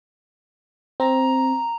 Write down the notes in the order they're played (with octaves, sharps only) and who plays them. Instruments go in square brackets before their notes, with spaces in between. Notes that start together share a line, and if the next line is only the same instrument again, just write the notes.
[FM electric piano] C4 [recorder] A#5